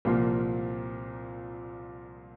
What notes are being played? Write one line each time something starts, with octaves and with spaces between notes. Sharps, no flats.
C2 A#2 F3 A#3 F4